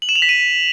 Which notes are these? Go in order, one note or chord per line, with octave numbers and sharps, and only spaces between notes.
F#7
E7
F7
B6
D#7